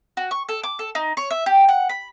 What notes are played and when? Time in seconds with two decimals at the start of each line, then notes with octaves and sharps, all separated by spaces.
0.17 F#4
0.31 C#6
0.49 A4
0.63 D6
0.79 A4
0.95 D#4
1.17 C#5
1.30 E5
1.46 G4
1.69 F#5
1.89 B5